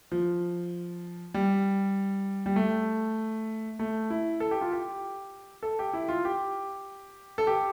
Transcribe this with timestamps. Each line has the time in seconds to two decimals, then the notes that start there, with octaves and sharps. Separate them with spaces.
0.12 F3
1.34 G3
2.46 G3
2.56 A3
3.79 A3
4.10 E4
4.40 A4
4.51 G4
4.61 F4
4.72 G4
5.63 A4
5.79 G4
5.93 E4
6.08 F4
6.25 G4
7.38 A4
7.47 G4